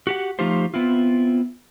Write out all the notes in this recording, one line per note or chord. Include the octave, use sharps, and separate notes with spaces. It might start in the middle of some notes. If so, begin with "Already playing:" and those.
F#4 G4 F#5
F3 A3 D#4 F4 G4 C5
B3 C4 E4 F4